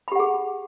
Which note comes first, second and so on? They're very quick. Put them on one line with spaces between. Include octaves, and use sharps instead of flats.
B5 G4 F#5 G#4